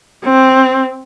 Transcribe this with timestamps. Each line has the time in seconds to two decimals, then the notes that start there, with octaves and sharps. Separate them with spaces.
0.24 C4